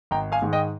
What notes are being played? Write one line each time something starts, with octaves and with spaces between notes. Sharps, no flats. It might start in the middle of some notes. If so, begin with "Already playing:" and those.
G#1 G5 A#5
F5 G#5
G#2 D#3 G#3
D#5 G5